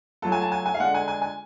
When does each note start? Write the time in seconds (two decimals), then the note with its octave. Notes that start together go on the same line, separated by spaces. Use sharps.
0.22 F#3 A3 F4 A4
0.32 G#5
0.42 A5
0.52 G#5
0.66 G#5
0.74 F5
0.79 D3 G#3 D4 F#5
0.94 G#5
1.08 G#5
1.22 G#5